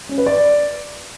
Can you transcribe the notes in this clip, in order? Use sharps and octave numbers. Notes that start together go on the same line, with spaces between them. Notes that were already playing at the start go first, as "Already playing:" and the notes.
C#4
B4
D5